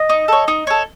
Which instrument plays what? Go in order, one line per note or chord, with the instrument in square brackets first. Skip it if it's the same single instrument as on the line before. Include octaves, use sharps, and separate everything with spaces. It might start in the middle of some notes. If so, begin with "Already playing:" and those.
Already playing: [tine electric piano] D#5
[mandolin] D#4
A4 C#5
D#4
A4 C#5